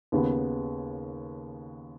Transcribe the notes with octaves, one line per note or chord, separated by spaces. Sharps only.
D#2 C#3 B3